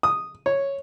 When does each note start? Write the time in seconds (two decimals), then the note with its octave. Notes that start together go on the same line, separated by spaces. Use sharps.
0.03 D#6
0.46 C#5